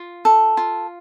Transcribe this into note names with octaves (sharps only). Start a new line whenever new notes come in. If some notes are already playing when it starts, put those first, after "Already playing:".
Already playing: F4
A4
F4